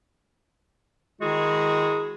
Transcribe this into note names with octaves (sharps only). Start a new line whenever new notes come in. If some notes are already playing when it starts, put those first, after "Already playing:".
D#3 G#3 E4 F#4 G#4